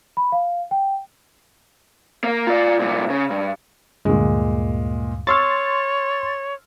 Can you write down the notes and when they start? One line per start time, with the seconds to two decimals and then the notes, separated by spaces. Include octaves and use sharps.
0.17 B5
0.32 F5
0.71 G5
2.24 A#3
2.47 F4 D5
2.79 C2 A#2
3.10 C#3
3.30 G2
4.05 D2 G2 A#2 G#3
5.27 C#5 C6 C#6 E6 F6 A6